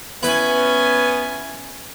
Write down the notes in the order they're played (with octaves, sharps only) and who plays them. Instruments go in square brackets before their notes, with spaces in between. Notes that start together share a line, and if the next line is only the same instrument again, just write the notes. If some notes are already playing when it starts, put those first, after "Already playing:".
[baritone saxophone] B3 [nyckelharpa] C#4 G#5 [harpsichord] E4 B4